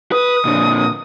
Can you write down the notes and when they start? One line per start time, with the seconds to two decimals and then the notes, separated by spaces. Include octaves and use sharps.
0.12 B4 D#6
0.45 A#2 D3